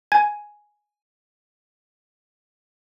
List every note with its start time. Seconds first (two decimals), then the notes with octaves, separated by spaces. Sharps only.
0.12 G#5 G#6